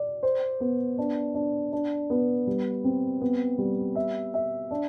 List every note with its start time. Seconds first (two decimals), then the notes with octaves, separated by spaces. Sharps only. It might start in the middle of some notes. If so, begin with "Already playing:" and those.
Already playing: D5
0.23 C5
0.60 B3
0.98 D4
1.35 D4
1.72 D4
2.10 B3
2.47 G3
2.84 C4
3.21 B3
3.58 G3
3.96 E5
4.34 E5
4.71 D4